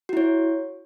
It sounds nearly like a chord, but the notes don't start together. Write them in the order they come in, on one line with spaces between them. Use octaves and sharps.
F#4 E4 C#5